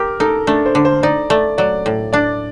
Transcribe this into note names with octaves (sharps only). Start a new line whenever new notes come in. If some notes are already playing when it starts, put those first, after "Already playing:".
Already playing: G4 A#4
D#4 A4
A3 D4
C5
D3
C5
D#4 D5
A3 D5
F#3 D5
A2
D4 D5